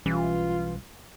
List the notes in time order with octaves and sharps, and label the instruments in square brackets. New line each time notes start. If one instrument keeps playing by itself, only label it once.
[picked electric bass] B1 G3 C#4 [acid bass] E3 [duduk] F4